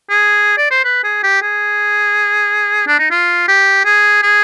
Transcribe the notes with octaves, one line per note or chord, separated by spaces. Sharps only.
G#4
D5
C5
B4
G#4
G4
G#4
D4
D#4
F4
G4
G#4
G#4